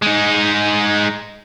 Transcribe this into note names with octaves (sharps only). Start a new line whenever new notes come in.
G#3 D#4